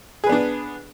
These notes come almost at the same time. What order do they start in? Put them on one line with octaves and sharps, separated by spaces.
G#4 B4 B3 D4